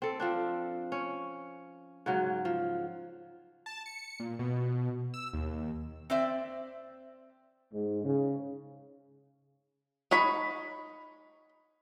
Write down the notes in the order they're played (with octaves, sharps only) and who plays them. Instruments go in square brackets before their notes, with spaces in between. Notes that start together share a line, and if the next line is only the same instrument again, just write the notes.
[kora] C4 A4
F3 C4 D4
C#4
G#2 C#3 F#3
F3
[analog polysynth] A5
C#7
A#2
B2
E6
D#2
[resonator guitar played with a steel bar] C4 C5 D5 E5
[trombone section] G#2
C#3
[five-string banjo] D#4 C#5 B5